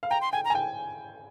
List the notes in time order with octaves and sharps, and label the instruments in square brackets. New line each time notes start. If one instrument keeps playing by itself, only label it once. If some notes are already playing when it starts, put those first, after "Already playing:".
[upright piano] F5
[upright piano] G5 [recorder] A#5
[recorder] C6
[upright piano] G5 [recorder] G#5
[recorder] A#5
[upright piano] G#5
G5